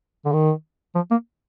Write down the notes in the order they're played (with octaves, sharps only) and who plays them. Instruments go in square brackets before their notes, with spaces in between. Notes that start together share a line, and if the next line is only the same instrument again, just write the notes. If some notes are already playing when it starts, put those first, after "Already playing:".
[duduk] D3
D#3
F3
A#3